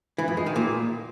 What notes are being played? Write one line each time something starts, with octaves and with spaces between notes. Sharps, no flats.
E3
F2
G#3
D#3
A#2